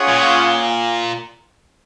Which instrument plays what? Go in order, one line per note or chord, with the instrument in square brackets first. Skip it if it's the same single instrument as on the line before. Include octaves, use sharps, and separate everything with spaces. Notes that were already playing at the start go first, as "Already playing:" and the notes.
Already playing: [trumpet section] C#4 F4 G#4 C#5 F#5
[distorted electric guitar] A#2